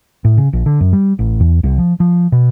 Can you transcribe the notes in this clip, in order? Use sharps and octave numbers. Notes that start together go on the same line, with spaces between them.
A2
C#3
A#1
D3
F#2
G3
A1
E2
C2
F3
F3
B2